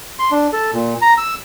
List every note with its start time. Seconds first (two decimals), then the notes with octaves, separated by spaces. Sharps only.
0.19 C6
0.31 D4
0.53 A4
0.73 A#2
1.02 A#5
1.18 E6